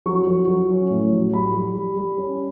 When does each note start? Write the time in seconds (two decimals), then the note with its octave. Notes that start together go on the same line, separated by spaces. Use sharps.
0.06 F#3 C#6
0.27 F#3
0.47 F#3
0.70 C#4
0.90 A2
1.12 F#3
1.33 G3 B5
1.54 G3
1.75 G3
1.97 G3
2.18 C#4